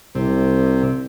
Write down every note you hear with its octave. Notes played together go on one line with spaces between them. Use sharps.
C2 C3